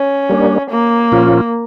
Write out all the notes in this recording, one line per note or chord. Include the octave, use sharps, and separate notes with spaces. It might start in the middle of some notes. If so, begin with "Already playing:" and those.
Already playing: C#4
G3 A#3 D4
A#3
A#2 F3 C#4 F4